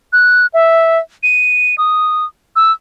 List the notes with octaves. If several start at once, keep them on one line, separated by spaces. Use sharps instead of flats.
F#6
E5
D#7
D#6
E6